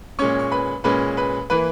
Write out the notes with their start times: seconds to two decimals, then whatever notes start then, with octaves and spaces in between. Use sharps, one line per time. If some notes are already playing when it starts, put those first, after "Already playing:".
0.19 A#2 G#3 C#4 C#5 C#6
0.39 C#6
0.52 B4 B5
0.84 A#2 G#3 C#4 B4 B5
1.17 B4 B5
1.50 E3 A#3 B4 B5